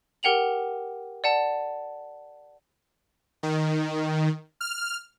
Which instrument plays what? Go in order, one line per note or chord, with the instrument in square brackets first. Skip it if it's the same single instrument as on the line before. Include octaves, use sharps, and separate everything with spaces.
[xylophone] G4 A#4 F#5 G5 F7 F#7
D5 F#5 A5
[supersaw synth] D#3
F6